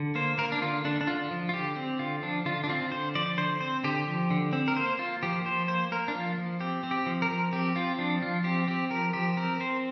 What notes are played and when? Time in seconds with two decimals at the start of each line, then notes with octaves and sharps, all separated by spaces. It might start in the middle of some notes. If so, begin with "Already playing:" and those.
Already playing: D3
0.15 A#3 C5
0.38 A#3 A#4
0.52 D4
0.61 D3 F4
0.85 D3 D4
1.01 D4
1.07 D3 F4
1.31 F3
1.49 F4
1.53 D3 G4
1.76 C4
1.99 D3 F4
2.23 F3 D4
2.45 D3 F4
2.64 D4
2.69 C4 F4
2.92 D3 C5
3.15 F3 D5
3.37 D3 C5
3.61 C4 C5
3.84 D3 G4
4.07 F3
4.30 D3
4.53 C4
4.68 A#4
4.76 A#3 C5
4.99 A#3 F4
5.23 F3 G4
5.45 F3 C5
5.68 A#3 C5
5.92 A#3 A#4
6.08 D4
6.14 F3 F4
6.38 F3
6.60 C4 G4
6.83 C4
6.91 G4
7.06 F3
7.22 A#4
7.29 F3
7.53 C4 G4
7.75 C4 F4
7.99 F3 D4
8.22 F3 F4
8.44 C4 G4
8.67 C4 G4
8.90 F3 A#4
9.13 F3 G4
9.37 C4 A#4
9.60 C4 C5